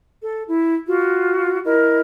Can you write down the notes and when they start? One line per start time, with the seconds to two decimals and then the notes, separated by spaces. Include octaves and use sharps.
0.23 A4
0.49 E4
0.87 F4 F#4
1.65 E4 A#4 D#5